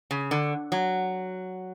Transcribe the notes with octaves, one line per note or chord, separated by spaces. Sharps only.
C#3
D3
F#3